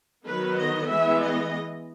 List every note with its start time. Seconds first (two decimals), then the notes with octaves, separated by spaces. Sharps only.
0.24 D#3 F#3 B3 B4
0.56 D#5
0.88 E3 G#3 B3 E5
1.20 D#5